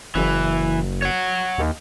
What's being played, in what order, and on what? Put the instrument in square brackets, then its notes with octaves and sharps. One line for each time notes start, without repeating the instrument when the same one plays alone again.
[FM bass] F#1 [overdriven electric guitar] E3
[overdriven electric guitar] C#5 F#5
[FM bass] D#2